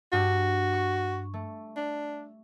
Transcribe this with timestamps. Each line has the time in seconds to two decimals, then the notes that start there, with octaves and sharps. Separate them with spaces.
0.13 G2 F#4 G4
0.73 C#6
1.34 A3
1.77 D4